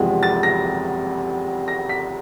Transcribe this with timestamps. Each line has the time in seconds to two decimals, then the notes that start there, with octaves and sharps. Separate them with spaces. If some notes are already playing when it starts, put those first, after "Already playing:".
Already playing: F#1 E2 C3 F3 G#3
0.23 A6
0.43 A#6
1.68 A#6
1.89 B6